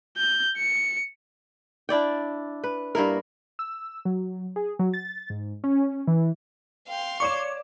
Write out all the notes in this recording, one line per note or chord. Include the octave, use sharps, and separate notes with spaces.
G6
C#7
D4 E4 D5 G5
B4
G2 A#3 E4 A#4
E6
F#3
G#4
F#3
A6
G#2
C#4
E3
F5 G5 C6
C#5 D5 C#6 D6 E7